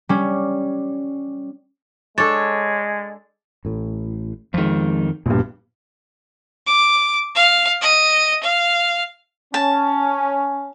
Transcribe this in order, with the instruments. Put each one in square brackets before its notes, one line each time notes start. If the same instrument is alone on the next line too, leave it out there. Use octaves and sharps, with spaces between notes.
[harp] G3 C#4
[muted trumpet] G#3 [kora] D4 A4 [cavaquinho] C#5 [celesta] A6
[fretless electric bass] A1 A2
[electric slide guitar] F2 D#3 [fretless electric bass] F3 G#3
[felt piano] A#1 G2 [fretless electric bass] B2
[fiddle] D6
F5
D#5
F5
[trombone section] C#4 [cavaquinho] A5